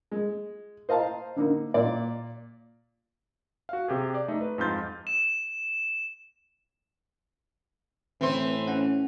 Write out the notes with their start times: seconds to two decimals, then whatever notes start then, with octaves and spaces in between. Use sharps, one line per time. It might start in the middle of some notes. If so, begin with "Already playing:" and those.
0.12 G#3
0.89 C5 D#5 F5 A5 A#5
1.36 D3 A#3 D#4
1.74 A#2 D5
3.69 F#4 F5
3.88 C3 G4 G#4
4.14 D5
4.28 A3 D#4
4.41 B4
4.58 F2 G#2 F4 G6 A6
5.07 E7
8.21 A2 E3 C4 C5
8.67 C#4 F#5